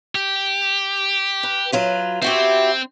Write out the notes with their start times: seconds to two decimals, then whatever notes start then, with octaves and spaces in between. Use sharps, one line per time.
0.15 G4
1.43 B4
1.72 F#3 F4 B4
2.22 C4 E4 F#4 G4